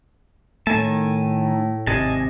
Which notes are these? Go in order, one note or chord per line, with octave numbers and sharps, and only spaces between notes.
A2 D#3 A3 G#5 A5
G#1 C3 D#5 G#5 A5